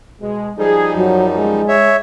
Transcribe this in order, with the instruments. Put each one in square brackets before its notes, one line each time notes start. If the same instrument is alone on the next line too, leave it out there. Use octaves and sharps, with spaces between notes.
[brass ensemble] B2 G#3
[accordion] F3 G3 D#4 [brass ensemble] G#4
[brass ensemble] F#2 [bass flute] F#3
[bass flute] G#3
[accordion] C#5 E5